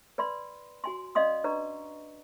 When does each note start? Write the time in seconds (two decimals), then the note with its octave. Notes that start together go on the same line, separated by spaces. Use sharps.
0.18 B4 D5 B5 C6
0.84 F#4 G#5 C6
1.15 C#4 D5 D#5 F5 C6 D#6
1.44 D4 B4 D5 A#5 C#6